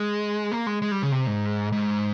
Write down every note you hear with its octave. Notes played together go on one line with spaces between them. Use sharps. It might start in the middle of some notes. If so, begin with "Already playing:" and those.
Already playing: G#3
A#3
G#3
G#3
G3
C#3
C3
G#2
G#2